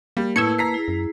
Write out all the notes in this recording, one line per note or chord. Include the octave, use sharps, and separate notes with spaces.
G3 A#3
A2 E4 B4 A5 E6 G#6 C#7
A#5 B6 C7
E4 G#4
F#2